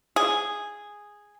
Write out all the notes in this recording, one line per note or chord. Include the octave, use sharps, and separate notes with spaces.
G#4